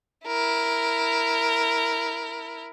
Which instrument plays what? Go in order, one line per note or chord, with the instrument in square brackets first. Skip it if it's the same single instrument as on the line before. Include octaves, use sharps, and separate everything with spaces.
[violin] E4 A#4